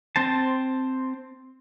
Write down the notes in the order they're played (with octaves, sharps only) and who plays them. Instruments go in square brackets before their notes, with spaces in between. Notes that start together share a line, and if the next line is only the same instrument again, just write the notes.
[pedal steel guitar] C4 C5 A5